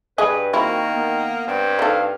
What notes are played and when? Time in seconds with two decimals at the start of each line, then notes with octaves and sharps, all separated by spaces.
0.18 G2 G#4 B4 D#5
0.53 D#3 A#3 C4 E4 F#4
0.94 B3
1.47 G2 C4
1.79 D#4 A4 F5